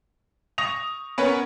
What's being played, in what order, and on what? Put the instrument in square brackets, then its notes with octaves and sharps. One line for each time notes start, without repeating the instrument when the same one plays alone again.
[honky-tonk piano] C#6 D#6 A#6 F7
B3 C#4 A#4 B4 C#5 F#5